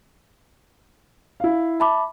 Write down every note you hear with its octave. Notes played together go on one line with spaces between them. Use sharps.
E4 F5
E5 A5 B5 D6